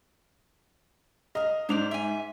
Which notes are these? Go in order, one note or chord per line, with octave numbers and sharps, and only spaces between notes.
A#4 D#5 F5
G#2 D4 C5 D5 F7
E5 G#5